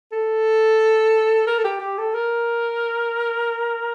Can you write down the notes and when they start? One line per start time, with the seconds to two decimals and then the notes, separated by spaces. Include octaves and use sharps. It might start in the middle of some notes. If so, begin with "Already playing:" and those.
0.12 A4
1.47 A#4
1.58 A4
1.65 G4
1.80 G4
1.98 A4
2.14 A#4